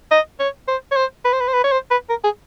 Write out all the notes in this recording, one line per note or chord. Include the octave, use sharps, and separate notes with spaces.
D#5
C#5
C5
C#5
C5
B4
C5
B4
C5
B4
C#5
C5
B4
A#4
G#4